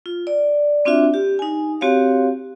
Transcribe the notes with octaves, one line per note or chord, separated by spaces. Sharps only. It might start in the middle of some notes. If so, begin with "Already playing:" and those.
F4
D5
C4 D4 F4 F#4 E5
G4
D#4 G#5
C4 F#4 G4 C#5 F5